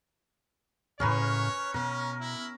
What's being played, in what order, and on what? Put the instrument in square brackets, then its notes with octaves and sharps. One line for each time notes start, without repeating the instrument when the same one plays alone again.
[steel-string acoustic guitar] A2 C#3 G#4 [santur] C#4 A#4 B4 [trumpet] C#5
[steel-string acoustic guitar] B2 [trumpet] C#4 [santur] A#4
[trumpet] E4